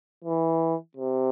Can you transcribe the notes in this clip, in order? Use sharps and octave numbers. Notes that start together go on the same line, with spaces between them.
E3
C3